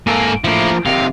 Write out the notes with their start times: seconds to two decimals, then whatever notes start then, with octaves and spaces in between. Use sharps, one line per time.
0.07 G#2 A#3 A4 G#5
0.44 F3 A3 A#3 E4
0.86 C3 D#3 F5